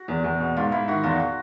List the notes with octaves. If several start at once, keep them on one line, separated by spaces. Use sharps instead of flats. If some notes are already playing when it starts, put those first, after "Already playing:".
Already playing: F#4
E2
E2
B2
G#2 F4
G#2 E4
D#3 F#4
E2 F4
F#4